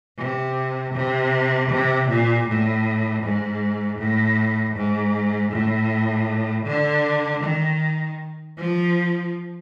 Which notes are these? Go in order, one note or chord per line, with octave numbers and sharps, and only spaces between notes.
C3
C3
C3
A#2
A2
G#2
A2
G#2
A2
D3
D#3
F3